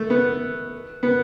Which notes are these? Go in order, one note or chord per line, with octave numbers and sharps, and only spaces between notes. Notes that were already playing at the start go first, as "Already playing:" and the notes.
Already playing: A3
B3
B3